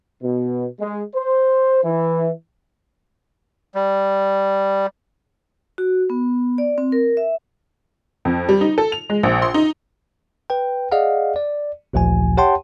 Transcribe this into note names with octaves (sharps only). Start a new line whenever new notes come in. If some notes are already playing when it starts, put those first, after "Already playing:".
B2
G#3
C5
E3
G3
F#4
B3
D5
C4
A#4
E5
F2
G3
D#4
A4
F7
G#3
A#1
C6
D#4
B4 G5
G#4 D5 D#5 F5 F#5
D5
A1 D2 A#2 F3 G#5
G4 C#5 F#5 G5 A5 C6